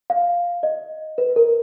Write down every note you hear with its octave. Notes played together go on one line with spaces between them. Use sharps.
F5
D#5
B4
A#4